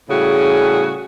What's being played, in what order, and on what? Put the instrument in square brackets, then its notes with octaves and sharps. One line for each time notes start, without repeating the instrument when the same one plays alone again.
[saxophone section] A2 C#3 G3 F#4 G#4